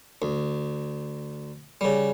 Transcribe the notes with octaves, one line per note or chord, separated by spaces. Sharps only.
D2
C#3 G3